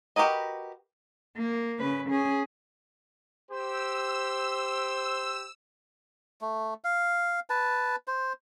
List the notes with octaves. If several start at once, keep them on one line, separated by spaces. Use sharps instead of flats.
F#4 G4 A#4 B4 D#5
A#3
C#3 B4
C#4 G#4
G4 C5 E6
A3
F5
B4 A5
C5